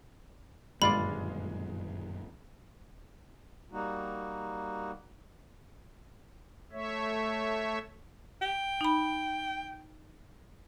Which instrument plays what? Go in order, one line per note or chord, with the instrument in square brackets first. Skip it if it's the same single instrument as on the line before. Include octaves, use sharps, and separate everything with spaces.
[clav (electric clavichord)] G1 F4 D5 [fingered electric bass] F#2 A#2 D#3 [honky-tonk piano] G#3 [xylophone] B5
[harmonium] G3 A#3 D#4 F#4
[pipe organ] A3 C#5 E5
[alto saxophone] G5
[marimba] D#4 B5